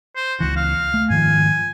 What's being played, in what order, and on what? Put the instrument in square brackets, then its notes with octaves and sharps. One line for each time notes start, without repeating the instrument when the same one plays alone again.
[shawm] C5
[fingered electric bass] C#2 E3 [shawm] F#4
[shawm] F5
[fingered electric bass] A3
[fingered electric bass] G#2 D#3 F3 [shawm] G#5